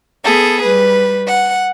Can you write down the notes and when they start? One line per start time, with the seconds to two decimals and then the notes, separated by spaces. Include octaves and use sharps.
0.24 B3 G#4 A4
0.63 G3 B4
1.27 F#5